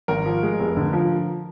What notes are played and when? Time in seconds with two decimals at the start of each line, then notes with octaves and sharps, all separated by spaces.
0.08 G#1 A#4
0.25 F3
0.43 G#3
0.60 F1
0.77 D3
0.93 F3